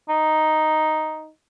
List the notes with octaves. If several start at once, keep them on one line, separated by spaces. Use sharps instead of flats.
D#4